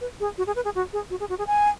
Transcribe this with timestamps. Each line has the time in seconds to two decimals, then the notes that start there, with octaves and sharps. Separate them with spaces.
0.01 B4
0.20 G#4
0.38 F#4
0.47 G#4
0.56 B4
0.65 G#4
0.75 F#4
0.93 G#4
1.10 F#4
1.20 G#4
1.29 F#4
1.39 G#4
1.47 G#5